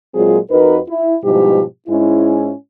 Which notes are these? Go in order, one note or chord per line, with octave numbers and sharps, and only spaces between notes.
A#2 F#3 G#3 C4 F4 G#4
F2 D#4 F#4 A#4 B4
E4
G#2 B2 F3 G3 E4 G4
G#2 G#3 C#4 E4